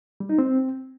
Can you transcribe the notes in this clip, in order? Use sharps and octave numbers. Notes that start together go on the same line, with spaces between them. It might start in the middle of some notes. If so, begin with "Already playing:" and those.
G3
D#4
C4